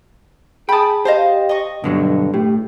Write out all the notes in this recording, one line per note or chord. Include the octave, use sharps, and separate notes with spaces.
G#4 G5 A5 B5 D#6
G4 C5 D#5 F5 A5
D#5 C#6
G2 B2 D3 F#3
A2 G4